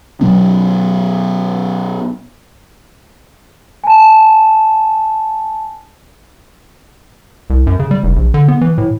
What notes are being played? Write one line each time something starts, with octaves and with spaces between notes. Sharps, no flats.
B2 F#3 B3 C#4
G#5 A5
C2
F#2
C#3
G3
F1
A#1
D3
B3
E3
A2